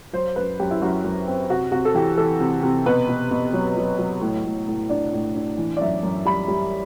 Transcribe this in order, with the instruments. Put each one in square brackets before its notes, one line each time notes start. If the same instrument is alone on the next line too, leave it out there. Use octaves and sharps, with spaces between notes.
[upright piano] F#3 C5
F#2 B4
F#2 G4
E4
F#2 F#4
F#2
C4
C3 F#4
C3 F#4
A4
E3 G4
E3 A4
C3
C3
B2 B4
B2
B2
F#3
F#3
F#3
A2
A2
A2
D4 D5
A2
D4
E3
D5
F#2 E5
F#2
G3 B5
G3